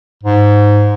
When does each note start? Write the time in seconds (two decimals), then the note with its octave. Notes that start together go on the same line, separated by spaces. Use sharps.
0.23 G#2